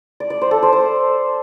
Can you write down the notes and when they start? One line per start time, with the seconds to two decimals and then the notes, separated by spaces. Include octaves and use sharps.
0.20 D5
0.30 D5
0.42 C5
0.51 A4
0.63 C5
0.73 C5